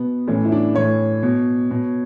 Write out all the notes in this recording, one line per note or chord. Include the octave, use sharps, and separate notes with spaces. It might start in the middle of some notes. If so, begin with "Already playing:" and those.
Already playing: B2 B3
A2 E3 C#4
E4
D4
A2 E3 C#5
B2
B2